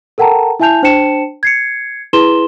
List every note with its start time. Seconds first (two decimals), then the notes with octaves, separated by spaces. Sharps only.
0.18 A4 A#4 F#5 G5 A5 A#5
0.60 E4 E5 G#5 A5 G6 F7
0.83 D4 C5 G5 A5 C#7 E7
1.43 G#6 C7 C#7
2.13 E4 G#4 B4 C6 E7 G7